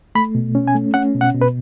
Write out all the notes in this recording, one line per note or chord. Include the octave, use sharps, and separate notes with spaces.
A3 B5
B2
C#4
G#5
A3
C#4 F#5
B2
F#5
B2
B4